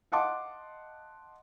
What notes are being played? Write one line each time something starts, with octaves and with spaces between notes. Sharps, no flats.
D#5 F5 F#5 A5 C6 D6